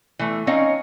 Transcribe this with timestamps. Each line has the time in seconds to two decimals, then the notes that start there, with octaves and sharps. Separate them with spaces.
0.19 E3 A3
0.47 C4 C#4 D#4 C#5 D#5 F5